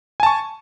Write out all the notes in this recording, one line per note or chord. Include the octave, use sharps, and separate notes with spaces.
G#5 A5 C#6